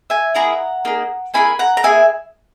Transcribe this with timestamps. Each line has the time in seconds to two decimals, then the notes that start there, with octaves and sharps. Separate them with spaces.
0.10 E5 G#5
0.35 A#3 E4 G#4 F#5 A#5
0.85 A#3 D#4 G#4
1.34 A#3 E4 G#4 G#5 B5
1.59 F#5 A#5
1.77 A#5
1.83 A#3 E4 G#4 E5 G#5